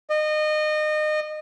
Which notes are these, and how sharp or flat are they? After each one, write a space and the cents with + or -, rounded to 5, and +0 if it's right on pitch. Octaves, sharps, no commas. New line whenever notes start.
D#5 -30